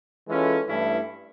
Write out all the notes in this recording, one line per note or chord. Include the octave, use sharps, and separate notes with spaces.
E3 G#3 C#4 F4 A4
G2 E3 A3 C#4 E4